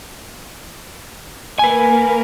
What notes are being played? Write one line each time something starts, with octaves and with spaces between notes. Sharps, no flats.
A#3 A#4 B4 G#5